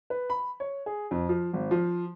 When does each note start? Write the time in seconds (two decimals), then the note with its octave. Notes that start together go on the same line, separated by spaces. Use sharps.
0.10 B4
0.30 B5
0.60 C#5
0.86 G#4
1.11 F2
1.29 F3
1.53 G#1
1.71 F3